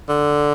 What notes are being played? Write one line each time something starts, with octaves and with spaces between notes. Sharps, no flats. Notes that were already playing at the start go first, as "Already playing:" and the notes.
D3